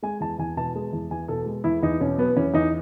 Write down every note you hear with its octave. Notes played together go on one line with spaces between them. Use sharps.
G#3 G#5
E2 A5
E2 G#5
B2 A5
G#3
E2
E2 G#5
B2 A4
G#3
E2 E4
E2 D#4
B2 C#4
F#3 B3
E2 C#4
E2 D#4